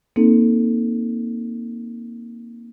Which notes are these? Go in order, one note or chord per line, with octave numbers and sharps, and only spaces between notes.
A#3 C4 D#4 A4